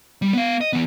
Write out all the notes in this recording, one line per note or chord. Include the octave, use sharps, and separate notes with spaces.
G3
B3 F5
D#5
E3 B3